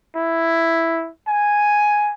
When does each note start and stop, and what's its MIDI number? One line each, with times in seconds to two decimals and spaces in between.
0.16 1.10 64
1.28 2.13 80